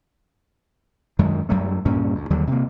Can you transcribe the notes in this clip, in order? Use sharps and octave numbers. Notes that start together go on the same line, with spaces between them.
F#2 D#3 G#3
F#2 F#3 G3 A3
D2 G2 A#2 C#4
D2
D#2 D3 F#3 G3
C3 A#3